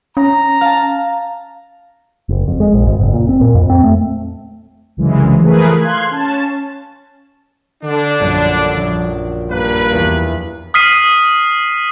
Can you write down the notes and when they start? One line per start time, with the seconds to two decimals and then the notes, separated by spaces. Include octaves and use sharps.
0.17 C#4 A#5
0.61 F5 A5
2.29 F#1
2.48 F2
2.60 G#3
2.74 A#1
2.86 G#1
3.00 F#1
3.14 A#2
3.29 C4
3.41 A#2
3.55 F2
3.70 C4
3.84 A3
4.97 C2 F#2 C#3 E3 G#3
5.40 E3 F3 A3 G#4 A#4 B4
5.81 F5 C6 F#6 G#6
6.11 C#4 A5
7.84 D3 D4
8.20 A#1 F#2 G3
8.77 A#1
9.51 G2 A#3 B4
9.93 E2
10.74 D#6 F6 B6 C7 D#7